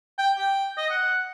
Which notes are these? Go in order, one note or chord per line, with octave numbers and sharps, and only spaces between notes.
G5
G5
D#5
F#5